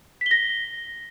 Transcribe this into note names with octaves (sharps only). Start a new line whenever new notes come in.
A#6 B6 G7